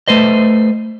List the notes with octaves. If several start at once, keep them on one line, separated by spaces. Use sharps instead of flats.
A3 B4 C5 D#5